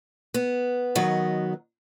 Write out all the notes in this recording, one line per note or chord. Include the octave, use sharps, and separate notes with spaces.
B3
D#3 F#3 B3 D#5